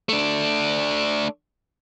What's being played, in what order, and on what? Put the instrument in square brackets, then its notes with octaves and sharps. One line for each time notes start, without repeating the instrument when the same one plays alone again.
[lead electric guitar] A3 D4